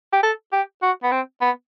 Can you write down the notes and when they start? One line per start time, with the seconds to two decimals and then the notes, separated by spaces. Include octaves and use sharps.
0.13 G4
0.23 A4
0.52 G4
0.82 F#4
1.03 B3
1.11 C4
1.41 B3